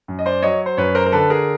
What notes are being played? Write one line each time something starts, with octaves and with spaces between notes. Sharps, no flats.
F#2
D#5
C5 D5
F#3 C#5 D#5
C5
F#2 B4 C#5
A#4 C5
A#4
D3 A4 B4
G#4 A#4